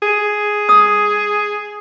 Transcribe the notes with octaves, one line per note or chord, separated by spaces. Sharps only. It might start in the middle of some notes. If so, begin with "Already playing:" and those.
G#4
D#6